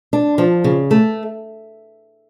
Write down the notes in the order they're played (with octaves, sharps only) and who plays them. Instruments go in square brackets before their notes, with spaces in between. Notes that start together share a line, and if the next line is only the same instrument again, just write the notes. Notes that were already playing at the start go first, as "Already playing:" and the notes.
[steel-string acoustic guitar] D4
F3
C#3
A3